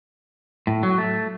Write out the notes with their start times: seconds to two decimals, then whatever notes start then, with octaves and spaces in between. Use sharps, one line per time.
0.67 A2
0.83 F#3
0.98 A3